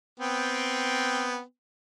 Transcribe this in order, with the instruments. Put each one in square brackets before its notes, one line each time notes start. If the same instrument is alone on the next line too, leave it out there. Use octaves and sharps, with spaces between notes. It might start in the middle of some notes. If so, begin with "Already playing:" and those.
[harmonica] B3 C4 G5